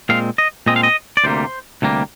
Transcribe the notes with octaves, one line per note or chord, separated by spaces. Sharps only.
A#2 G#3 C4 F5
D#5
A#2 G#3 C4 D#5
F5
D#5
D5
D2 C3 G3 A#3 C5
D2 C3 G3 A#3